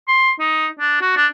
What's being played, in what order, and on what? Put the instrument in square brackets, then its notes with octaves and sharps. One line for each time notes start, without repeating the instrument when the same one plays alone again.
[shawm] C6
D#4
D4
F#4
D4